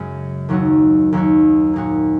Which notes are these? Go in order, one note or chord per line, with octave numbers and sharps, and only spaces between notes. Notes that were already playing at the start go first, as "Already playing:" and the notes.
Already playing: F#2 C#3 G#3 C#4
D#2 D#3 F#3 D#4 F#4
D#2 D#3 F#3 D#4 F#4
A#2 A#3 D#4 F#4